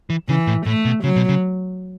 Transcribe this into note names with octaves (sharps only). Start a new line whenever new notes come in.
E3
C#3 E3
A2
A2 A3
B2
C#3 F#3
B2
C#3